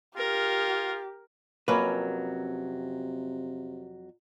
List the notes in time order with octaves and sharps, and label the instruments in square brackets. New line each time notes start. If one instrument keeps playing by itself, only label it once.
[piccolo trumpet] F4 [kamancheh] G4 [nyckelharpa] A#4
[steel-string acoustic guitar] F2 F#3 [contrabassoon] C3 [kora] A#3 C#4 [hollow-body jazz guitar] B4